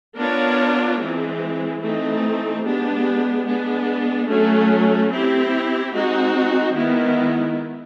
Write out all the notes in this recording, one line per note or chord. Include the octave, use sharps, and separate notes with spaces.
B3 D4 F4 A#4 C#5
E3 G#3 C4
E3 A3 C4 D#4
G#3 B3 D4 G4
G#3 B3 D4
F#3 A3 C#4
C4 E4 G4
G#3 C4 D#4 F#4
D#3 G#3 B3 E4